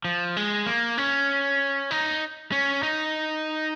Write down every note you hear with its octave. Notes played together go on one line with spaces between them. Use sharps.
F3
G#3
A#3
C#4
D#4
C#4
D#4